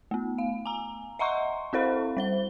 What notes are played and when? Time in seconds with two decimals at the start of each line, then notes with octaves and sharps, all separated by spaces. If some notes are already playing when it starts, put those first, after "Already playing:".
0.11 A3 B3
0.38 F5
0.66 G#5 A#5
1.19 D#5 E5 F#5 A#5 C6 C#6
1.73 C4 E4 A4 C5 F5 B5
2.17 G3 C5 G7